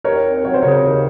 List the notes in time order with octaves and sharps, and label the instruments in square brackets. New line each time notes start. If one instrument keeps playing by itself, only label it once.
[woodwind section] D#2 [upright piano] A#4 C#5
[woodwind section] C4
[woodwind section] F#3 [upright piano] C#5
[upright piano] C5
[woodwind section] C#3 [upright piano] A#4 C#5
[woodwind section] D#2